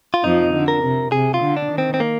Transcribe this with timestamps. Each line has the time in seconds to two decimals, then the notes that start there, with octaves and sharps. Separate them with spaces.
0.14 F4
0.23 F2 F3 D#4
0.54 D3
0.68 A#4
0.83 C3
1.12 C3 G#4
1.34 F4
1.42 D3
1.57 D4
1.71 D#3
1.78 C4
1.94 C4
2.00 A#3